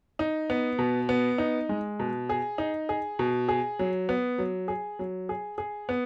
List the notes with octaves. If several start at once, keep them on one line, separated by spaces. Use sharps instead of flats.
D#4
B3
B2
B3
D#4
G#3
B2
G#4
D#4
G#4
B2
G#4
F#3
B3
F#3
G#4
F#3
G#4
G#4
B3